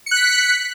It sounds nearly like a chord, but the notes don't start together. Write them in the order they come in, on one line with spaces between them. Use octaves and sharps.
C#7 F#6 B6